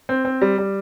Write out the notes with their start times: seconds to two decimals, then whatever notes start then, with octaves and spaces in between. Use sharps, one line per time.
0.09 C4
0.25 C4
0.41 G3
0.58 G3